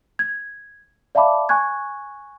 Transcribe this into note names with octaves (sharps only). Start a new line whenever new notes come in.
G#6
D5 E5 F5 A5 B5 D6
G#5 C#6 F#6 G#6